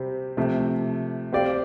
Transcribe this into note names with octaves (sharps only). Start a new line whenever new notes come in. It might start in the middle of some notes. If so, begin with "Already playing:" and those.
Already playing: C3 G3 C4
C3 F3 A3
C4 G4 D5 F5